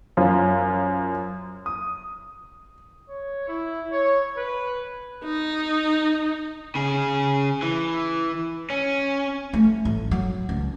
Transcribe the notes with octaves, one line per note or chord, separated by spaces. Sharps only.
F#2 F4 C5
D#6
C#5
E4
C#5
B4
D#4
C#3 G#4
E3
C#4
A3
A1
F#3
C#2